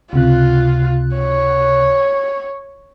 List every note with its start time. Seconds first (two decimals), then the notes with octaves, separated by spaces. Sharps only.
0.13 C#2 C3 F4 F#6
1.16 C#5